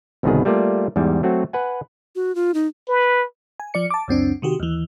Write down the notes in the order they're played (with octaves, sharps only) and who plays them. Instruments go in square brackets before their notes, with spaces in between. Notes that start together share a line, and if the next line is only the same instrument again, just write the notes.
[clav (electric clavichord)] G1 C2 B2 D#3 B3 G#4
G3 A3 A#3 F4 D5
E2 G#2 G3
F#3 A3 C4 F#4
B4 F#5 G#5
[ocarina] F#4
F4
D#4
[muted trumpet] B4
[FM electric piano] G#5
F3 D5 C#7
A5 D6
C#2 F#2 C4 D4
C3 D#3 F#4 G4
D#2 E3